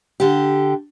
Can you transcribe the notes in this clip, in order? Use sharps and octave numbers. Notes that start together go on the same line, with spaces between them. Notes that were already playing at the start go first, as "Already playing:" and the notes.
D3 G4